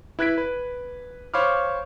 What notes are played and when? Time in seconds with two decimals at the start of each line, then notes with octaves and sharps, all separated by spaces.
0.19 E4 B4 F#6 G#6 B6 D7
0.38 B4
1.34 C5 C#5 F5 B5 D6 F6